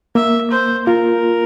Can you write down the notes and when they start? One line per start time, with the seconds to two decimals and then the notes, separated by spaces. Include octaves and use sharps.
0.15 A#3 E5
0.51 C5
0.86 F4 A#4